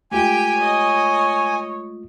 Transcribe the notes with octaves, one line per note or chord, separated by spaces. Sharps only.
G#3 A3 F4 G4 G5 G#5
C#5 D#5